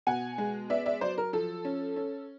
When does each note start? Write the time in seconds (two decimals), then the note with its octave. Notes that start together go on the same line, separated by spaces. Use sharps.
0.07 B2 F#5 G#5
0.38 G#3
0.70 B3 D5 E5
0.86 D5 E5
1.01 F#3 C5 D5
1.18 A#4
1.33 F3 A4
1.65 C#4
1.96 C#4